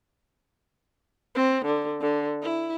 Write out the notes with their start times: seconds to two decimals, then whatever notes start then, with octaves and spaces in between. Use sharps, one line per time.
1.35 C4
1.65 D3
2.01 D3
2.43 E4